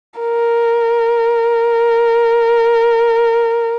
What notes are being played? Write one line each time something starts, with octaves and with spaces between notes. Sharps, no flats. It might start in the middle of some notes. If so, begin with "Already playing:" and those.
A#4